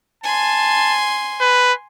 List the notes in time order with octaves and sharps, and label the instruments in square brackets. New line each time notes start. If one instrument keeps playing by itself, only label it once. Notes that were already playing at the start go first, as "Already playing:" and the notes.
[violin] G#5 C6 [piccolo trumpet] A5
[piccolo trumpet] B4